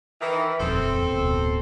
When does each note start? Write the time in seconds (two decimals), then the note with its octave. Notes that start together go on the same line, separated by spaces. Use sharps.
0.21 D#3 E3
0.60 D#1 F2 C4 A4
1.10 D1 B2